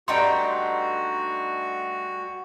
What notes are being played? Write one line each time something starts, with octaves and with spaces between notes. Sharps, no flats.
G2 A3 D4 D#4 F#4 G5 C6